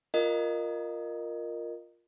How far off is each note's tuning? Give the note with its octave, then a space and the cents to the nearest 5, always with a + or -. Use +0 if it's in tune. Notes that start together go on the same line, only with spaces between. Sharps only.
F4 +0 A#4 +0 D#5 -15